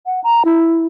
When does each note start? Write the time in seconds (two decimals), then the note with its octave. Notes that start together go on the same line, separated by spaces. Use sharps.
0.06 F#5
0.24 A#5
0.45 E4